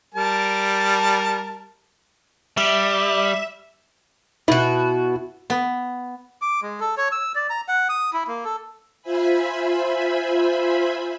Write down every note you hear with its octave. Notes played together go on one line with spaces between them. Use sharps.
G3 A#4 A5
G3 E5
B2 E4 F#4
B3
D6
G#3
A4
C#5
E6
D5
A#5
F#5
D#6
E4
A#3
A4
F4 C5 E5 G#5 B5